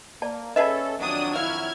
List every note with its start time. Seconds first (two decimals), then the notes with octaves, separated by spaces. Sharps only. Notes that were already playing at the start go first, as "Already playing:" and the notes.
0.22 A#3 D5 A5
0.56 C#4 G#4 A4 B4 D#5 E5 A5
0.99 F2 D#3 F#3 D4 D#6
1.36 E4 F5 F6 G#6